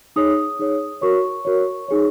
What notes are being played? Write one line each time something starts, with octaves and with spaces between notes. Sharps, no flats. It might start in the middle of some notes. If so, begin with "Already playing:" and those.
D#4 G#4 C#5 D#6
D#4 G#4 C#5
F#4 A#4 C#5 C#6
F#4 A#4 C#5
D#4 G#4 C#5